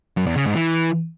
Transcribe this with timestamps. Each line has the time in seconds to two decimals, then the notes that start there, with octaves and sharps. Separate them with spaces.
0.17 F#2
0.26 E2
0.36 C#3
0.46 G#2
0.55 E3